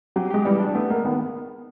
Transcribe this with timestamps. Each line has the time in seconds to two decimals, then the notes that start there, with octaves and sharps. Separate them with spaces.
0.16 F#3 G4
0.30 G#3 G4
0.45 E3 G3
0.60 D4
0.75 A3 B3
0.90 G#3 A#3
1.05 D#3 B3